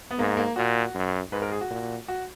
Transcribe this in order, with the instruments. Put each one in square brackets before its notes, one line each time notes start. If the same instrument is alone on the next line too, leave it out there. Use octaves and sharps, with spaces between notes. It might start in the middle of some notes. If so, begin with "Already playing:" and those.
[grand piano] B3
[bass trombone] G#2 [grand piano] A#3
[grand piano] A#3
[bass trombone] A#2 [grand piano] F#4
[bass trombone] F#2
[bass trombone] G#2 [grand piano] B4
[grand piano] A#4
G#4
F#4
[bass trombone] A#2
[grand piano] F#4